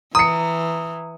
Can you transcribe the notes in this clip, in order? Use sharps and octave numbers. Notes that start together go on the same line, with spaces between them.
E3 A#5 D#6 C#7